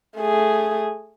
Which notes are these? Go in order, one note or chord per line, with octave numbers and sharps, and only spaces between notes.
A3 G#4